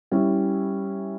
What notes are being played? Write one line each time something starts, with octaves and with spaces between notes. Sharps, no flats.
G3 C#4 E4